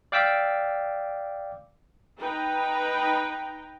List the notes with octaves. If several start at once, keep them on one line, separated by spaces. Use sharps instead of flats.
D5 F5 G5 D6 E6 B6
D#4 B4 G5 A#5